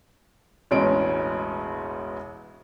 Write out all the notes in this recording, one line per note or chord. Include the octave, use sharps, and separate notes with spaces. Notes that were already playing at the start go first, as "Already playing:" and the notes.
E1 A1 B2 G#3 C#4 D7